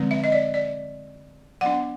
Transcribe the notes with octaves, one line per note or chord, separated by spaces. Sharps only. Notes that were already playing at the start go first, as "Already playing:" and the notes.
Already playing: D3 F3 G#3 C4
E5
D#5
D5
D5
F#3 B3 D4 F#5